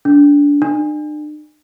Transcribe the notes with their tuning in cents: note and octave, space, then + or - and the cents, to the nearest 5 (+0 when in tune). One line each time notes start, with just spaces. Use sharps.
D4 -25
D4 +45